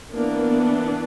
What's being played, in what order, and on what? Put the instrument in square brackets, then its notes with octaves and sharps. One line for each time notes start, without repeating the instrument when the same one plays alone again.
[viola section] E3 A#3 B3 D4 A#4